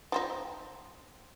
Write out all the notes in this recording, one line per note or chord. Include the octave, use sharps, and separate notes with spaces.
F3 C4 D#4